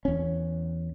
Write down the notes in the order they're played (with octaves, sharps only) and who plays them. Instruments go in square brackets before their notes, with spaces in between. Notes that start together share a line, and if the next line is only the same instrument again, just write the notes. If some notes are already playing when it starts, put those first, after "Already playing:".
[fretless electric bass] E2 C#4